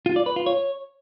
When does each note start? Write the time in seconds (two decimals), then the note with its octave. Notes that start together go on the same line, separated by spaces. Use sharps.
0.06 F4
0.16 D5
0.26 B4
0.36 F4
0.46 C#5